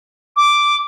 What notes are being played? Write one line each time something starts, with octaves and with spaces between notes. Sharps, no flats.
D6